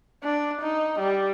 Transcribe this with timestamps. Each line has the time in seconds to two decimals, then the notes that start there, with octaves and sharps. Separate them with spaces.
0.23 D4
0.62 D#4
1.00 G3